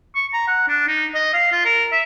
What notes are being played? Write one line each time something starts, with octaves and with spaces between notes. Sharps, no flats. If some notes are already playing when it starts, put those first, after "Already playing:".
C#6
A#5
F#5
D4
D#4
D#5
F5
F4
A#4
E5